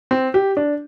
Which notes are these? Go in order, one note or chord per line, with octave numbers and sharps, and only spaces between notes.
C4
G4
D4